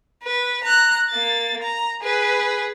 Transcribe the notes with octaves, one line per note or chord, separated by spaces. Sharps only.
B4
A#5 F#6
A#3 A6
A#5
G#4 B4